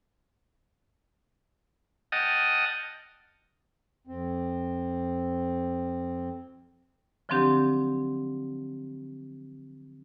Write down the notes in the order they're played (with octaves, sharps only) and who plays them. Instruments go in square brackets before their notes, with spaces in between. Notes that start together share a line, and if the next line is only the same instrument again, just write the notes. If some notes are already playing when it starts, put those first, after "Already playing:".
[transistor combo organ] D#5 F#5 G5 A5 D#6 F6
[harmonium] F2 C4
[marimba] D3 F3 F#3 C4 D4 G4